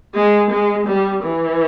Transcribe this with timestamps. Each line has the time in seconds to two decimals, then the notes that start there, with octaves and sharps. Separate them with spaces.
0.15 G#3
0.51 G#3
0.87 G3
1.23 E3